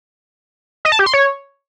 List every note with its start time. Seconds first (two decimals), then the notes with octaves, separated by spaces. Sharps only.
0.85 D#5
0.92 A5
0.99 G4
1.06 C6
1.14 C#5